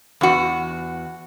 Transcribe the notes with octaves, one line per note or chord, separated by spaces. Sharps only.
E2 F#4